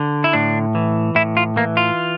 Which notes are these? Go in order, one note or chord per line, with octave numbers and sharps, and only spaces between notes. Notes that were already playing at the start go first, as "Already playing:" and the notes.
Already playing: D3
E4
A2 D4
E3
A2 E4
F4
E3 A#3
F4